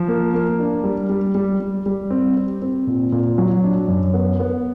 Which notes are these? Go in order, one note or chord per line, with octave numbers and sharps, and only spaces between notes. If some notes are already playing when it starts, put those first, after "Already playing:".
Already playing: F3
A#3
A#3
D4
G3
G3
G3
G3
G3
C4
C4
C4
A#2
A#2
F#3
D4
F#2
B3
B3